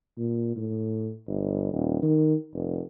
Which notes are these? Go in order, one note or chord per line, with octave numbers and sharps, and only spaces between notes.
A#2
A2
G1
D#1
D#3
F1